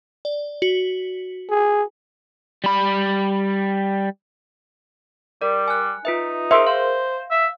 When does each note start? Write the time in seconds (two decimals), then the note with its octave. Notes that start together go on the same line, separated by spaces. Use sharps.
0.25 D5
0.62 F#4
1.50 G#4
2.64 G3 B5
5.41 G3 A#4 D5
5.68 G#5 F#6
6.05 D#4 F4 B4 E5
6.51 G#4 A#4 C5 E5 C6
6.67 C5 F5
7.31 E5